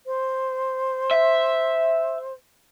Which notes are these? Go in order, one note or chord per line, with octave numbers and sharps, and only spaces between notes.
C5
E5